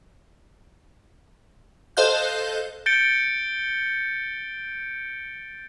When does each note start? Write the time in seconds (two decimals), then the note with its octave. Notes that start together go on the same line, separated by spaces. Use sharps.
1.97 A4 C5 D#5 F5 F#6 G6
2.86 G6 A6 C#7 D7 G7